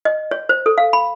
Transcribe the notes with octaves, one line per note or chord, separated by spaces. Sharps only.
D#5
C#5
C5
A4
F5
B5